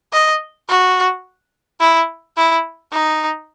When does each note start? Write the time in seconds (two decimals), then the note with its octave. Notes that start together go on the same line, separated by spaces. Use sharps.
0.13 D#5
0.69 F#4
1.80 E4
2.37 E4
2.93 D#4